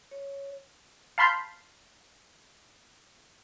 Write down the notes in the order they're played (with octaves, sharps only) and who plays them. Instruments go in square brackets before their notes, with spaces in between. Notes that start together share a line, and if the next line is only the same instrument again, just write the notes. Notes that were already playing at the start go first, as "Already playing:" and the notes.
[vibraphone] C#5
[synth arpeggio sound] F5 A5 B5 C6 F6 G6